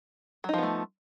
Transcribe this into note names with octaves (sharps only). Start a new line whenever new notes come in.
F3 F#3 A3 B3 D#4